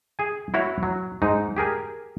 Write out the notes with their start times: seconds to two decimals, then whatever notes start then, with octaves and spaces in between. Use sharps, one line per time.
0.19 G#4 G#5
0.54 E4 F#4 C#5 F#5
0.83 F#3
1.22 G#2 D#4
1.57 G4 G#4 A#4 G#5